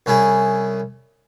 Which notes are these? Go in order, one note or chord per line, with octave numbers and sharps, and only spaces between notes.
C2 C#4 E4 G#4